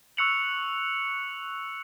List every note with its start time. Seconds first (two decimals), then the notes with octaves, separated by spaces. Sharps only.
0.17 C#6 E6 F#6 C#7 F7 F#7